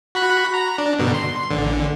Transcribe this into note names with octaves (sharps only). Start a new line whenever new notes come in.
F#4 B5 F#6
A#5
D4
G2 B2 D3
C6
A1 D3